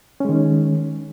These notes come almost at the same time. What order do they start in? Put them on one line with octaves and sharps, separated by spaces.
C#4 G#3 D#3